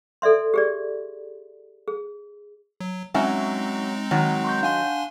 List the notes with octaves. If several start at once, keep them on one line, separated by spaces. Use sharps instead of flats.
A4 D5 E5 C6
G4 G#4 D5
G#4
F#3
F#3 G#3 C4 C#4 D#4 E5
D#3 F#3
C6 C#6 G6
D4 F5 F#5 G#5 C6